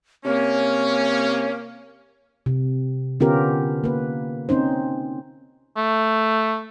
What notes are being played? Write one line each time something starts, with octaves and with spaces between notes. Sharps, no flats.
C3 A#3 C#4 C#5
C3
D3 B3 C#4 F4 G4 A#4
A#3 B4
C4 C#4 D#4 C5
A3